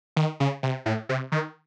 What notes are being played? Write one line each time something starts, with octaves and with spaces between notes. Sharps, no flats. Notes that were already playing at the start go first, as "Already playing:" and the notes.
D#3
C#3
C3
A2
C3
D#3